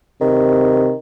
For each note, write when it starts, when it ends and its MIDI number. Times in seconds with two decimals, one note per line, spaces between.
0.21 0.91 48
0.21 0.95 51